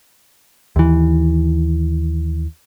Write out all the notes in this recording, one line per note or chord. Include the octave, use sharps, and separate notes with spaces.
D#2 E3